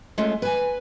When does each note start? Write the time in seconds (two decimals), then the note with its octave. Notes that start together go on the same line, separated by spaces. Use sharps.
0.18 G#3 A3 C#4 F4
0.42 B4 G#5